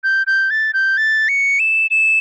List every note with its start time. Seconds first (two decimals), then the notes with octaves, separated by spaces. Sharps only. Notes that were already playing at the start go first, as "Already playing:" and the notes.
0.04 G6
0.27 G6
0.50 A6
0.74 G6
0.97 A6
1.29 C#7
1.59 E7
1.91 E7